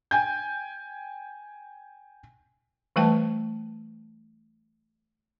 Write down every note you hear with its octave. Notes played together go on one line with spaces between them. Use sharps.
G5 G#5 G6
E3 G3 A3 B4 G5 A5